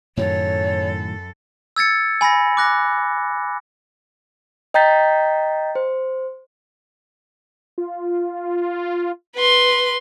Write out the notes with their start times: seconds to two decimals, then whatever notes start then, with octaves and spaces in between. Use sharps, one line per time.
0.17 F#2 A2 D#3 F#3 A4 C#5
1.76 E6 G#6 A6 C#7
2.21 G#5 B5 A6 A#6
2.57 D6 F#6 A#6
4.74 D#5 G5 A#5 G6 A6 B6
5.75 C5
7.78 F4
9.35 B4 C6